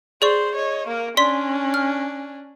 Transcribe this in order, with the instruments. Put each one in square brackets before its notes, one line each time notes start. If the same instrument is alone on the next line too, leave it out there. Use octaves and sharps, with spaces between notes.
[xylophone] G#4 D5 C#6 [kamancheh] C5
[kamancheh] C#5 D#5
A#3 A#4
[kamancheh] C#4 D4 [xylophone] D5 C6 B6
[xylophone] F6